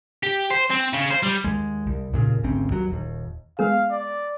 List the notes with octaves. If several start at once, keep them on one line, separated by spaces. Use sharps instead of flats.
G4
C5
C4
C#3
C5
G3
D#2 G#3
C2
D#2 A#2 C#3
G#1 D2 C4 C#4
D#2 F#3
D#1 D#2
G#3 B3 G#4 F5
D5